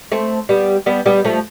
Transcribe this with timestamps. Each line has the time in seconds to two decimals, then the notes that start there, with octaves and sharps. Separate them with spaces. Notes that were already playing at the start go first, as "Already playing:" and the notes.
0.12 A3 C4
0.49 G3 B3
0.86 G3 B3
1.06 G3 B3
1.25 F3 A3